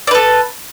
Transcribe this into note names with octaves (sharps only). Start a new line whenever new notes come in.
A4 B4 D5